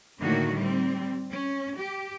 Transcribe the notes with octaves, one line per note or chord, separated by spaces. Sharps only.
A2 D3 D#3 A#3 F#4
G3 C4
C#4
G4